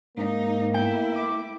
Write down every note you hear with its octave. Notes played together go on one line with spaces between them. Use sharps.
G#2 A#3 D#4
A3 B3 E4 G5
D6